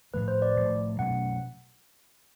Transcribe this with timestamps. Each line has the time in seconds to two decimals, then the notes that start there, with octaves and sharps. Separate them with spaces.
0.14 A2 F3 A3 B4
0.28 C5
0.42 D5
0.57 A2 F3 A3
0.99 B2 F#3 A3 C#4 F#5